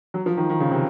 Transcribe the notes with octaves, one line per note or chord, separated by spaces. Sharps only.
F#3
F3
D#3
D#3
C#3
C3